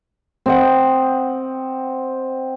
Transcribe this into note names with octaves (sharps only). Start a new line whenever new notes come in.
C4 D#5 F#5